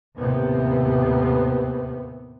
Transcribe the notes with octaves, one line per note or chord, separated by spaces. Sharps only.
D#2 A2 C3 B3